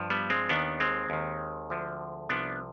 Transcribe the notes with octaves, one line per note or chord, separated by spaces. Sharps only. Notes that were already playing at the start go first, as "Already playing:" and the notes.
Already playing: G2 F3
G3 B3
G#3 C4
D#2 D#3 B3 D4
G#3 C4
D#2 D#3
D2 D3 F3
C2 C3 F3 B3 D4